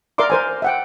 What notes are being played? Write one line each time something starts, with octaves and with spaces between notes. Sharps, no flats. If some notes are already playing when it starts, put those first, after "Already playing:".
A#4 D5 E5 C6 D6
A#4 C5 G#5
E5 F#5 G5